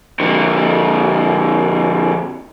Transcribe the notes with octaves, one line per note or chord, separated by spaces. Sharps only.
F2 D3